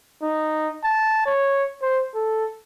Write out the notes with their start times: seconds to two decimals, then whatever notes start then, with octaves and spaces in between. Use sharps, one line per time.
0.23 D#4
0.84 A5
1.26 C#5
1.82 C5
2.15 A4